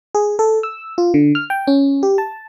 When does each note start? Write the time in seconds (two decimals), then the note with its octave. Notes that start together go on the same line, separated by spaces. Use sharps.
0.15 G#4
0.39 A4
0.63 E6
0.98 F4
1.14 D3
1.35 F6
1.50 G5
1.67 C#4
2.03 G4
2.18 A5